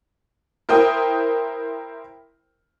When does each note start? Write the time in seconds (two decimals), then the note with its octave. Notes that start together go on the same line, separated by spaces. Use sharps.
0.69 E4 A#4 C5 G5 D#6